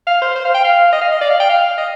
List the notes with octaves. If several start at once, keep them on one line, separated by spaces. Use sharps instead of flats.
F5
C5
C5
F5
G5
F5
D#5
F5
D#5
D5
F5
G5
F5
D#5